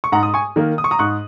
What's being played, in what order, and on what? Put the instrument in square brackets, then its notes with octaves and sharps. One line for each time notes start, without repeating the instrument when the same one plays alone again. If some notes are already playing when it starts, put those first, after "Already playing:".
[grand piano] C#6
G#2 F#5 A#5
D#6
G#5 C#6
D#3 A#3
D#6
C#6
A#5 D#6
G#2 C#6 F#6